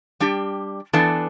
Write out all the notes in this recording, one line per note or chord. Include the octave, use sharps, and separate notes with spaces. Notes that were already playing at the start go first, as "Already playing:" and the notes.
G3 D4 G4
E3 B3 D4 A4